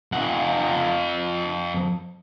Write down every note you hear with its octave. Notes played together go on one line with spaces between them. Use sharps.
F2 F#5